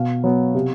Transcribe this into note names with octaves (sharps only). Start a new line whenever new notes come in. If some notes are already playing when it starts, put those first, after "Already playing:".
Already playing: B2 F5
F#3 B3
C3